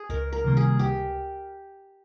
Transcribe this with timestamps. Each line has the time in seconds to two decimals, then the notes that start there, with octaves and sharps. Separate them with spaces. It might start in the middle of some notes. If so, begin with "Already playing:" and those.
Already playing: G#4
0.09 C#2 A#4
0.32 A#4
0.44 C3 D#3 G3 A#3
0.57 G#4
0.79 C#2 G4